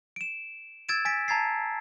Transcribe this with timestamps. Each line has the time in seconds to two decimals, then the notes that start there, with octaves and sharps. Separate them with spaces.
0.16 D7 E7
0.89 E6 G#6 A6 D7 E7
1.05 G#5 A6 B6 D7
1.28 A5 A#5 G#6 A6 C7